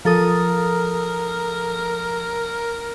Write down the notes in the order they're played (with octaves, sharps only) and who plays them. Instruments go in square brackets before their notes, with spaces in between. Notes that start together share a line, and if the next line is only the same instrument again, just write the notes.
[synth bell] F3 A4 D#6 [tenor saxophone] A#4